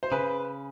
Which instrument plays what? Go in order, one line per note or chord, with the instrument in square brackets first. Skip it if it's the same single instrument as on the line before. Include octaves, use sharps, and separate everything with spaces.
[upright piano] C5
[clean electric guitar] C#3 [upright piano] B4